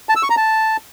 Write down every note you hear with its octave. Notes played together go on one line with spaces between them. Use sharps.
A5
E6
C#6
A#5
A5